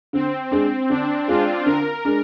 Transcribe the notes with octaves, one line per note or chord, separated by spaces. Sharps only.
D3 C4
G#3 C4 D4
D3 D4
G#3 D4 F4
D3 A#4
G#3 D4